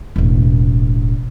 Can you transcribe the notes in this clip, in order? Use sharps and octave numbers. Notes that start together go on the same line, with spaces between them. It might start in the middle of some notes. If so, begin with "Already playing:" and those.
E1 A1